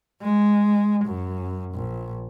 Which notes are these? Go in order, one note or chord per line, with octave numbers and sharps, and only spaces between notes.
G#3
F#2
A#1